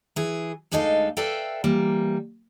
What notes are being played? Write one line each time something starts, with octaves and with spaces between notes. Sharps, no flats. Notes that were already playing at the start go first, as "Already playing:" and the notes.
E3 G#4
D2 G#3 D4 D#4 A4 F5
A4 B4 D5 E5 F5 G5
E3 G3 A#3